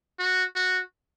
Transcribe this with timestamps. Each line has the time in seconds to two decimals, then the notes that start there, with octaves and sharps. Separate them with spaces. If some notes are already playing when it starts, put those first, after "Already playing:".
0.19 F#4
0.55 F#4